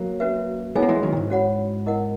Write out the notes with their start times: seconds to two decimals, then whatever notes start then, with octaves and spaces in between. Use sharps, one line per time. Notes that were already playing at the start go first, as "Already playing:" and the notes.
Already playing: F#3 A#3
0.20 C#4 F#4 B4 E5
0.75 G#3 B3 C#4 E4 G#4 C#5 G#5
0.82 A#3
0.89 E3 G#3
1.03 D#3 F#3
1.12 A#2
1.17 G#2
1.30 C#4 F#4 C#5 F#5 B5
1.86 E4 A#4 D#5 F#5